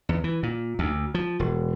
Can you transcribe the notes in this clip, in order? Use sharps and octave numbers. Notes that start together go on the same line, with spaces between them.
E2
E3
A#2
D2
F3
E1